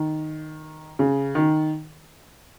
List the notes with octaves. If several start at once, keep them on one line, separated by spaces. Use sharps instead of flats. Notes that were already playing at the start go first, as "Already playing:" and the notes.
Already playing: D#3
C#3
D#3